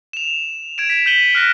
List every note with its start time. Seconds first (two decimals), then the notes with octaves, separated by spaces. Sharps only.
0.13 E7 F7
0.78 G#6 D7 E7
0.90 B6
1.06 G6 B6 C#7 D#7 F#7 G7
1.35 F6 F#6 A#6 B6